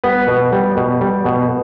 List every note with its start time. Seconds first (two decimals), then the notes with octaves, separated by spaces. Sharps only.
0.04 G3 B3 B4
0.28 B2
0.52 G3
0.77 B2
1.01 G3
1.25 B2